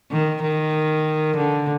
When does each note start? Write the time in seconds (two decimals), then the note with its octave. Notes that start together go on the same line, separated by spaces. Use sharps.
0.11 D#3
0.42 D#3
1.36 D3